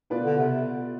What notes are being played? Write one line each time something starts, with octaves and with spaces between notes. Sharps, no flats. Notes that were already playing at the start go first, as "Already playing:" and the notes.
B2 B3 F4 B4 D5
D3
C3